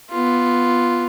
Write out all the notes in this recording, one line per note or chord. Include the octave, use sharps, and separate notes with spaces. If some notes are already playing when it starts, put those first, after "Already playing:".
B3 F4